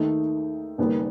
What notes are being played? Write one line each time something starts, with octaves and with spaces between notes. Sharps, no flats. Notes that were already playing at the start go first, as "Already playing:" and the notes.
Already playing: D#2 D#3 A3 D#4
F#1 F#2 D#3 G3 B3